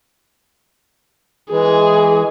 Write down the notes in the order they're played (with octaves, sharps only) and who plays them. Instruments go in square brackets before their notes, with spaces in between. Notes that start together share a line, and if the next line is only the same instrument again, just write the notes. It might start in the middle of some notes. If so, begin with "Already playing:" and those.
[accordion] E3 G#3 [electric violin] G#4